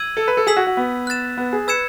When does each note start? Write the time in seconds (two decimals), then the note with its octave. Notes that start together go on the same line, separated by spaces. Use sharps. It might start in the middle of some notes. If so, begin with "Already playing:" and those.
Already playing: E6 G#6 D#7 F#7
0.17 A4
0.28 B4
0.37 A4
0.47 G#4 E6 B6 F#7
0.57 F#4
0.67 F#4
0.77 B3
1.07 F#6 A6 E7
1.37 B3
1.53 G#4
1.67 B4 E6 G#6 C#7 E7